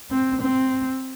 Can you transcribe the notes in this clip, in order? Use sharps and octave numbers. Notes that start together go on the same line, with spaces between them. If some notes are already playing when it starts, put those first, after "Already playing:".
C4
C4